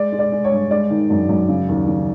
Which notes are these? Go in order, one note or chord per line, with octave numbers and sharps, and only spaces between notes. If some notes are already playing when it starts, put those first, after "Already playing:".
Already playing: G#3 D5
G#3
D5
G#3
C#5
G2
G#3 D5
D#3
F#2
F#2
C#3
D#2
C#3